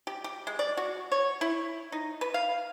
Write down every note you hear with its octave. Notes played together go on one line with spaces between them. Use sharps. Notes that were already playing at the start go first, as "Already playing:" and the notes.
G4
G4
G#3
D5
F#4
C#5
E4
D#4
B4
F5